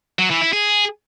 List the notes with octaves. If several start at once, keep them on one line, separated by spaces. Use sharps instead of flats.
F#3
E3
E4
G#4